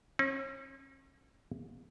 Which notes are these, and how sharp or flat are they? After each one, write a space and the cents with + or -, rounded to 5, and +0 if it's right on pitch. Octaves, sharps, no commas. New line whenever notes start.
C#4 -40